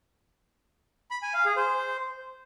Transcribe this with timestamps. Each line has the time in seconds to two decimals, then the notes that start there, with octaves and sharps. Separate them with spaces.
1.11 B5
1.22 G#5
1.34 F5
1.45 G#4
1.57 C5